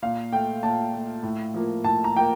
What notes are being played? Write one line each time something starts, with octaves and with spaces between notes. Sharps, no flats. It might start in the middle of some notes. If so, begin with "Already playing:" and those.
A#2 F5
A3 G5
A#2 A5
A3
A2
F3 A#3
A2 A5
A#5
F3 A#3 G5